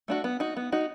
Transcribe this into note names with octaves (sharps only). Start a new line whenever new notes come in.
A3 D4 F#4
B3
D#4 F#4
B3
D#4 F#4